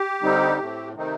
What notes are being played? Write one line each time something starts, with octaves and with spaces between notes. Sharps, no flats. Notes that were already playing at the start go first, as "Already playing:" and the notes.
Already playing: G4
D3 G3 C4 D#4
A2 A3 C4
C3 D#3 A3 C4 D#4